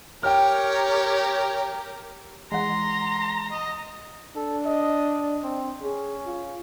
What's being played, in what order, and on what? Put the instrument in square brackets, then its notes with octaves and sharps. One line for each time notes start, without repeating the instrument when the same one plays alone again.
[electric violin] G4 A#4 [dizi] C#5 [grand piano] G5 F6
[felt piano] E3 F#5 [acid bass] G#3 [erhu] A#5 [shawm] C6
[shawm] D#5
[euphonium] D4 [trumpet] A4
[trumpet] D#5
C4
[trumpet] C#4 [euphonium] G#4
[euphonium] F4